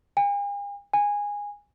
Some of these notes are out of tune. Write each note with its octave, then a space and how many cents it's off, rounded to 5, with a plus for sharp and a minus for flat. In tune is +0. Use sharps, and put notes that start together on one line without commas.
G#5 -45
G#5 -15